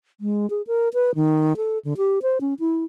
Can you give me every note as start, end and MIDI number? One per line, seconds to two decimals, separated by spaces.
0.21 0.49 56
0.50 0.62 68
0.67 0.89 70
0.94 1.15 71
1.15 1.57 51
1.57 1.78 69
1.85 1.93 50
1.97 2.19 67
2.22 2.38 72
2.41 2.54 61
2.60 2.84 64